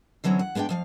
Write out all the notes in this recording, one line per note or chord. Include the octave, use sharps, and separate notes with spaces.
D3 E3 F#3 C4 C#4
F#5
G#3 B3 D4 F5 G5
F2 F3 F5